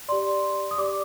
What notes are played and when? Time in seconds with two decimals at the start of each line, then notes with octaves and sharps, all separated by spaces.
0.08 G4 D5 C6
0.71 D#6
0.78 G4 D5 D6